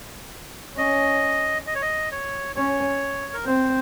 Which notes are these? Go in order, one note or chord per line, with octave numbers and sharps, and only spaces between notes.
C#4 D#5
D#5
C#5
D#5
C#5
C#4 C#5
A#4
C4 C5